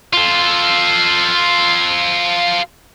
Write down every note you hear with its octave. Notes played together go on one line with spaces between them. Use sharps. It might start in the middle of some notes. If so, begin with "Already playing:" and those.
F4 A4